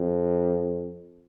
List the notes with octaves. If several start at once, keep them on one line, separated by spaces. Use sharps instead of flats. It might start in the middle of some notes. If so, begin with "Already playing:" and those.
Already playing: F2